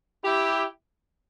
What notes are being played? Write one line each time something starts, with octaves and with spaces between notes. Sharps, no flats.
E4 G4